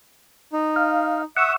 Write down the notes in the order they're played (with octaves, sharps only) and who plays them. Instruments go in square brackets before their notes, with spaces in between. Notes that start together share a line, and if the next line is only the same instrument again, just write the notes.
[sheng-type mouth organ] D#4
[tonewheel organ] F5
[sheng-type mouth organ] E5 D#6 [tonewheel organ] F#5 C#6 E6